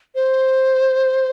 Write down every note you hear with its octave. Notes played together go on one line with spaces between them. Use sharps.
C5